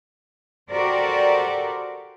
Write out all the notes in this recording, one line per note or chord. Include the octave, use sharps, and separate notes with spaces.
F#4 G4 A4 A#4 C5 D5